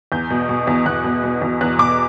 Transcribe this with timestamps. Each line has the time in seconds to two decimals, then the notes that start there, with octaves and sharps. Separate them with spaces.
0.12 E2 G6
0.30 B2
0.49 B2
0.67 E2
0.86 E2 F#6
1.04 B2
1.24 B2
1.42 E2
1.61 E2 F#6
1.78 B2 D6